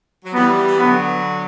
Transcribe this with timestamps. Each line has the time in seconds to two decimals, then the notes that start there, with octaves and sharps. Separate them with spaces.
0.25 F#3
0.33 E3 G3 B3
0.67 E3
0.78 D3 F#3 B3